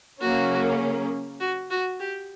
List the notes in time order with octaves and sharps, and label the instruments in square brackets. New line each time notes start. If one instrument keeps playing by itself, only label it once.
[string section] C#3 F#3 A#3 C#4 [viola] F#4
[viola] F#4
F#4
G4